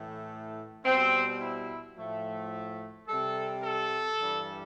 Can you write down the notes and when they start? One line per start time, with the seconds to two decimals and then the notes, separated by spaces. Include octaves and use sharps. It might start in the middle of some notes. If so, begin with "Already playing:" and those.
Already playing: A2 E3 A3
0.85 B2 G3 C4
1.41 E4
1.97 A2 F3 A3
3.08 C3 G3 A4
3.64 A4
4.20 G2 E3 G3